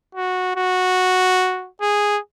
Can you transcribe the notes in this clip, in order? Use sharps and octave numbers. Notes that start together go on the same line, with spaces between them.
F#4
F#4
G#4